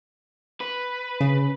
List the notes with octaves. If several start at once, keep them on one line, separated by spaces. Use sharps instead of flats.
B4
C#3 C#4